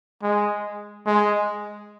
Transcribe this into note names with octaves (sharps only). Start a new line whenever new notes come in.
G#3
G#3